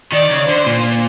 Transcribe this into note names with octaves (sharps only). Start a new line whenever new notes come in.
D#3 D5
C#3
D3 C5
A#2